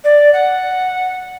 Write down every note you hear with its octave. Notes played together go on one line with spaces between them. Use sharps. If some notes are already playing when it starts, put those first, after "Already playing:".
D5
F#5